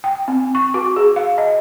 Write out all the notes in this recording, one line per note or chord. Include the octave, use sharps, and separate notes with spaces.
G5
C4
C#6
F#4
G#4
F5
D#5